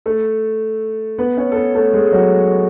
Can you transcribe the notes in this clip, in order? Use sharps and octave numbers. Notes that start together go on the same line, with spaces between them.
A3 A4
B3 B4
C#4 C#5
A4
B3 B4
A3 A4
G#3 G#4
F#3 F#4